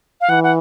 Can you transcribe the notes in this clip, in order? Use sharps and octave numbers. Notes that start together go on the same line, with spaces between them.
F5
E3 F#5
F#5